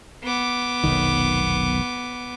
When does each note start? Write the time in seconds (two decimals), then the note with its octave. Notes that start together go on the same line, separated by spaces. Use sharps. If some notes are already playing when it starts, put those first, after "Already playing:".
0.23 B3 D6
0.84 F1 B1 D#3